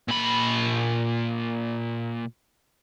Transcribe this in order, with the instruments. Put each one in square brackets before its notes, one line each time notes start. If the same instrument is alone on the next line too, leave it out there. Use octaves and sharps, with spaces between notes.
[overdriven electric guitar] A#2 B5